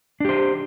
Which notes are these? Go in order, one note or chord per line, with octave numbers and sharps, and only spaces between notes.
D4 G4 C5